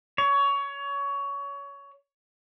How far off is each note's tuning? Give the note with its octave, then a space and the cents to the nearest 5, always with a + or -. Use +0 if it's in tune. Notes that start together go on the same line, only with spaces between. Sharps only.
C#5 +20